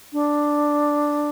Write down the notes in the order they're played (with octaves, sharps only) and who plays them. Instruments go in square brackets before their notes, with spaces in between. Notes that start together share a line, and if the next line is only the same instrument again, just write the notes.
[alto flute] D4